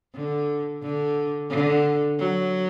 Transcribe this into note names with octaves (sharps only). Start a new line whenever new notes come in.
D3
D3
D3
F#3